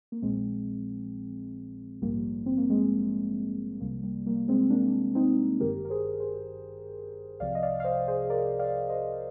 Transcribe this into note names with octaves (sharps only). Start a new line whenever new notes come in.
A#3
A#1 A#2 F3 G#3 C4
A#1 G#2 F3 G3 A#3
C4
A#3
G#3 C4
C2 C3 F3 G3 A#3
G3 A#3
G3 A#3
G#3 C4
A#3 D4
C4 D#4
G#1 G2 D#3 G4 A#4
A#4
G#4 C5
G#4 C5
C2 C3 F3 D5 F5
D#5
D5 F5
F5
C5 D#5
G#4 C5
A#4 D5
D5 F5
C5 D#5